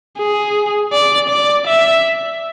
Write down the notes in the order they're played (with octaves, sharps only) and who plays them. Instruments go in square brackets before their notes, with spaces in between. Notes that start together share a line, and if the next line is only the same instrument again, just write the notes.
[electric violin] G#4
D5
D5
E5